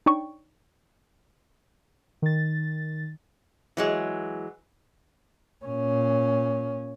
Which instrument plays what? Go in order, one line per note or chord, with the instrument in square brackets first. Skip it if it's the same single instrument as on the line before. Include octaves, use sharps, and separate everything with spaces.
[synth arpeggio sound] D4 D#4 C#5 D5 G5 C#6
[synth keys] D#3 A6
[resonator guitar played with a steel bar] E3 F#3 G#3
[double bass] A#2 C#4